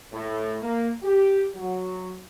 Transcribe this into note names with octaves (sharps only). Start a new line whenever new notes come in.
A2
A#3
G4
F#3